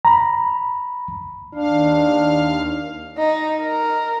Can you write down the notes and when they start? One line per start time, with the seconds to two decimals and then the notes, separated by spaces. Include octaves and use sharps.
0.05 A#5 B5
1.55 D#2 D4 F5
3.18 D#4
3.62 A#4